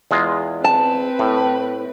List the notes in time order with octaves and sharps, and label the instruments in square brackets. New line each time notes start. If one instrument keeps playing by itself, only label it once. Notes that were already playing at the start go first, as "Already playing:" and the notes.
[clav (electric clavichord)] E2 G#3 F4
[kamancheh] C4 B4 [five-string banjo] A5
[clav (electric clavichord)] A2